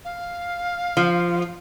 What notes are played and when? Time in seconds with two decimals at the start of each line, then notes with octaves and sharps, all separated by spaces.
0.05 F5
0.97 F3